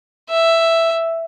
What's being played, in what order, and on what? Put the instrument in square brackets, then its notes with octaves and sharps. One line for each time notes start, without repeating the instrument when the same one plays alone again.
[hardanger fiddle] E5